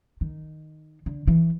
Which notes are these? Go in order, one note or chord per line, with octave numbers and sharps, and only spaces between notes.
D#3
D3
E3